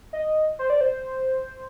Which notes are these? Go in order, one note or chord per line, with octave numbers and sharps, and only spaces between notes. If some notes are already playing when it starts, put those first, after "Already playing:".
D#5
C5
D5
C5